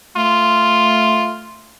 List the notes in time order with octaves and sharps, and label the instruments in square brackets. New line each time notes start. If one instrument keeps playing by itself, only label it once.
[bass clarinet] A3 [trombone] F4